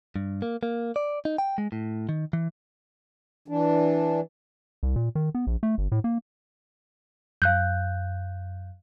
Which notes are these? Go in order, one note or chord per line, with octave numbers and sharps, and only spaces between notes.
G2
A#3
A#3
D5
D#4
G5
G#3
A2
D#3
E3
E3 D4
C2
A#2
D#3
B3
A#1
A3
G1
A2
A#3
F#2 F5 F#6 G6